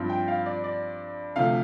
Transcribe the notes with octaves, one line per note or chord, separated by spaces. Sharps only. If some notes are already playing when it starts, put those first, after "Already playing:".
Already playing: G2 F3 C4
G5
F5
D5
D5
D2 C3 F3 A3 F5